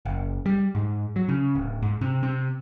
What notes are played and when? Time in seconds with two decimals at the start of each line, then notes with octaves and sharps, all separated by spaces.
0.05 F#1
0.46 G3
0.75 G#2
1.16 F#3
1.29 C#3
1.55 D1
1.82 G#2
2.01 C3
2.23 C3